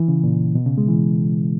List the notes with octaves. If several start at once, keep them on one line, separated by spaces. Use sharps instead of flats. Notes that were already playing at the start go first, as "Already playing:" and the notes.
Already playing: E3
C#3
A#2
B2
C#3
G#3
E3